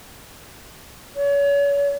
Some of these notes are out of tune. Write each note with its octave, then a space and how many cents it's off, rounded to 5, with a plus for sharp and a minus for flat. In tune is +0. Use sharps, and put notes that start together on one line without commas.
C#5 +35